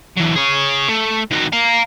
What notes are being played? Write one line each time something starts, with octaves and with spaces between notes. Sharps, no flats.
E3 F#3
G#4 C#5
A3
D#3 F#4
F5 A#5